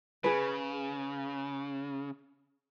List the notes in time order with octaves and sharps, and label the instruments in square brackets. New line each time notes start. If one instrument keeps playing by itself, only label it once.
[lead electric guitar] C#3 [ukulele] G#4 B4